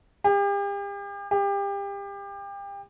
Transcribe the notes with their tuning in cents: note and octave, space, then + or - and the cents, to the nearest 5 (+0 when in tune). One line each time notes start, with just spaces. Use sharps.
G4 +40
G4 +30